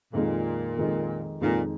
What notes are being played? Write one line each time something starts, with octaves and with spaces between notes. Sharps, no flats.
F2 A#2 D#3 G#3 D#4
F2 D#3 G#3 D#4
F2 A#2 D#3 G#3 D#4